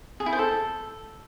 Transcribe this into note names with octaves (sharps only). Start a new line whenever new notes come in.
G#4
E4
C5
A4